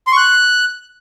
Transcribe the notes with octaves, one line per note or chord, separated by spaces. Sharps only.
C6
C#6
F#6